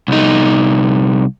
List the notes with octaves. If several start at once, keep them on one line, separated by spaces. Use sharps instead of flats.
C2 D#4